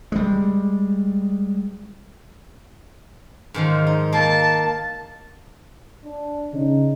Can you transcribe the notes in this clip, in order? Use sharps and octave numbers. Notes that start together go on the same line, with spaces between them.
G3 G#3
G#2 D#3 F3
D#4
A#3 A5
D4
C#3 D#4